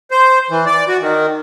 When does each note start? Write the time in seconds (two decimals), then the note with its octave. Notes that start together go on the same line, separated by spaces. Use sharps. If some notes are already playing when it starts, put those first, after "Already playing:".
0.11 C5
0.50 E3
0.66 D5
0.88 F#4
1.01 D#3